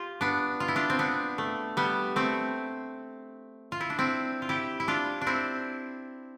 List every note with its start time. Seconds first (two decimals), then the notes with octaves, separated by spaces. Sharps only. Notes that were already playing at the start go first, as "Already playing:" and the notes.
Already playing: F4 G4
0.21 B3 D4
0.60 F4
0.68 E4
0.76 D4 F4
0.90 C4
0.99 B3 D4
1.38 A3
1.77 G3 B3
2.16 A3 C4
3.72 F4
3.81 E4
3.90 D4
3.99 C4 E4
4.42 F4
4.49 E4 G4
4.80 E4
4.88 D4 F4
5.21 D4
5.27 C4 E4